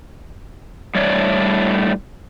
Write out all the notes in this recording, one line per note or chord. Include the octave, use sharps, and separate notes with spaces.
A2 G3 A3 D4 C#5 D5